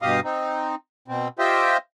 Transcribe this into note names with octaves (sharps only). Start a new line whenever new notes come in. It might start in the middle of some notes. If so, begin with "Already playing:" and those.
G2 B2 G4 D#5 F5 D#6
C4 D#4
B2 C4
F4 G4 C5 D#5 E5 G5